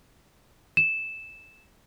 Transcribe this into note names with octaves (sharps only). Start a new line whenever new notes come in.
E7